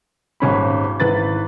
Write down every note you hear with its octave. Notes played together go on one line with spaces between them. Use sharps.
D#1 G#1 C#4 B5
G#1 E3 B4 A6